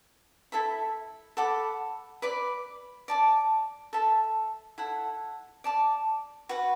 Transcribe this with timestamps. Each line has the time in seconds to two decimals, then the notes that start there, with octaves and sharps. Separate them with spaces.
0.52 E4 A4 E5 B5
1.37 A4 F#5 B5 D6
2.22 B4 D5 B5 D6
3.08 D5 A5 D6
3.93 A4 E5 A5
4.78 E4 A4 F#5
5.64 D5 A5 D6
6.49 F#4 B4 F#5